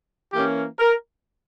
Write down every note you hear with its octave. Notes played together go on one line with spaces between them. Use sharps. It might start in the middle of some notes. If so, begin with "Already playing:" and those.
E3 A#3 C#4 G4
A#4